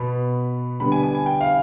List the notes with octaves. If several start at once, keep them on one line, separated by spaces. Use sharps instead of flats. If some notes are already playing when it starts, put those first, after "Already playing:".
Already playing: B2 B3 B5
D3 G3 B3 B5
G#5
G#5
G#5
G5
F5